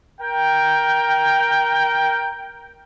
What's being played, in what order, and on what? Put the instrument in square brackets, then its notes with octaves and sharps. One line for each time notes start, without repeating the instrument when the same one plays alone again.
[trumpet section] A#4 G5